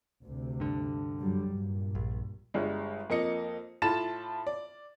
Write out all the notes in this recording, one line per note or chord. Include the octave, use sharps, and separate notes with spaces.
D2 C3
G2 D3
F#2 F#3 G3
G2 A#2
A#1
G1 G3 G#3
F2 A#3 D#5 C#7
A2 F4 A5 B5 A6 E7
D5